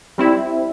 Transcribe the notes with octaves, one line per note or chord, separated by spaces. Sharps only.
G3 C4 E4